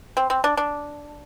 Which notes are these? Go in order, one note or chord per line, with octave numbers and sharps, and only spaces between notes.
C4
C4
D4
D4